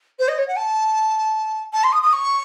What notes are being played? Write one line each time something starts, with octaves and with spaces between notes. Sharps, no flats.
C5
D#5
C#5
F#5
A5
A5
C6
D#6
D#6
C#6